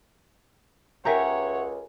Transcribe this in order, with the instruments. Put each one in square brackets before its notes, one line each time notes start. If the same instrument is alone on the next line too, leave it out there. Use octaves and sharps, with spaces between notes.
[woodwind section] C#2 [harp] G4 A#4 G#5 [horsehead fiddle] C#5 F#5 [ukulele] E5 A#5